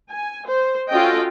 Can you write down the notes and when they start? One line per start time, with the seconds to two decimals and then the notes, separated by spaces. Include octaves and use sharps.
0.10 G#5
0.48 C5
0.92 C#4 F4 F#4 A4 D#5 G5